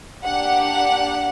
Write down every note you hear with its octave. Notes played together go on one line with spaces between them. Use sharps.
A#3 D4 G4 F#5